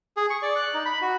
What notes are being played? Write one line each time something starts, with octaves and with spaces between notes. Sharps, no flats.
G#4
C#6
D5
F#6
D#4
B5
F#4